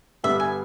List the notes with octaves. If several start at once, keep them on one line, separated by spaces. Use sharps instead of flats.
G2 D3 G3 B3 D4 E5
G#5